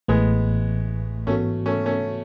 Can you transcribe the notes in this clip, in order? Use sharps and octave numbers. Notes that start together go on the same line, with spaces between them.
A1 A2 E3 G#3 A3 B3
G#2 E3 A3 B3 C#4 F#4
A3 C#4
A3 C#4